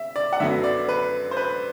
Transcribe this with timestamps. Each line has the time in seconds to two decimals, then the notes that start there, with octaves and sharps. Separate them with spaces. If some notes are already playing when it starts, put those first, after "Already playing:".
Already playing: E5
0.16 D5
0.33 F#5
0.40 F#2 D3 F#3 B3 E5
0.64 D5
0.89 B4
1.31 C5
1.37 B4